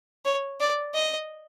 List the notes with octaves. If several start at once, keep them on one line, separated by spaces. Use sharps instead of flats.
C#5
D5
D#5